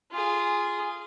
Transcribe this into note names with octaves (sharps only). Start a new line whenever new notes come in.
F4 G#4